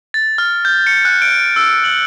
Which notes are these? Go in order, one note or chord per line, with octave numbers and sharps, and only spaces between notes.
A6
F6
G6
C#7
F#6
D7
E6
F#7